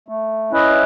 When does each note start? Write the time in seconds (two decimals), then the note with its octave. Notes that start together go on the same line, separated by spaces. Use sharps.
0.08 A3
0.52 C#4 E4 B4 D#5